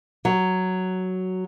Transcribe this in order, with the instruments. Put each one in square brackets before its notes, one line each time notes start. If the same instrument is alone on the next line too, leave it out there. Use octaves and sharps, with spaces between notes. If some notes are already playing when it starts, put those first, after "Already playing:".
[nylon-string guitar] F#3